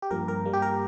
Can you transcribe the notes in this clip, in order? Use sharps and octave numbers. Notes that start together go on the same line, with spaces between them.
G4
G2 F3 A#3 A#4
A#4
G2 G3 A#3
G4
A#4